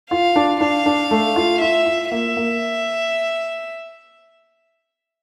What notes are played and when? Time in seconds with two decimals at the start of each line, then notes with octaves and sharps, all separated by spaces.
0.11 F4 F5
0.36 D4
0.61 D4 F5
0.86 D4
1.11 A3
1.36 F4
1.61 F4 E5
1.85 F4
2.11 A#3 E5
2.37 A#3